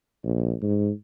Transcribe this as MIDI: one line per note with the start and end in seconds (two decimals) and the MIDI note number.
0.23 0.54 34
0.62 0.90 44